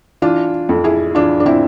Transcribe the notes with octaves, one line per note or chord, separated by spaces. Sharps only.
E3 D4 F4
F2
E4 G#4
E3 D4 F4
D4
C4 E4